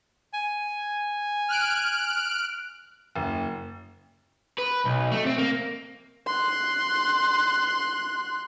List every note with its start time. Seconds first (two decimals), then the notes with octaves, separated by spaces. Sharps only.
0.34 G#5
1.48 F6 F#6 D7
3.16 F#1
4.59 B4
4.85 B1
5.11 A3
5.26 C4
5.38 A#3
6.27 C6 F#6